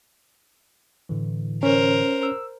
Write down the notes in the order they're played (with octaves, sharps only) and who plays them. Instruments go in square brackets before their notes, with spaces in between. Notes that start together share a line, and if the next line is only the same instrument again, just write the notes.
[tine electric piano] A2 D3 E3
[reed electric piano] C#4 [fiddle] A#4 C5
[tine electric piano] E6